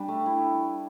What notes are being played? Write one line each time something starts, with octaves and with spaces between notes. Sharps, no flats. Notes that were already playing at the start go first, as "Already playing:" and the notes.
Already playing: G3 D4 G4
A3
E4